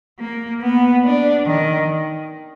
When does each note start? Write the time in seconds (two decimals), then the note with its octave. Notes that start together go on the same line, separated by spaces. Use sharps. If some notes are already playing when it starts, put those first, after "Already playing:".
0.20 A#3
0.62 B3
1.04 D4
1.46 D#3